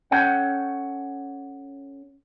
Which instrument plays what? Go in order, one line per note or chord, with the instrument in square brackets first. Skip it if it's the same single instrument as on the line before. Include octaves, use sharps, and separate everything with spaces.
[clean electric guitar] C#4 A4 F#5 G5